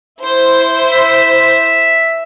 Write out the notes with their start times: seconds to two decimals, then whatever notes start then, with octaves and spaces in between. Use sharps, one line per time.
0.22 E4 C5
0.92 E5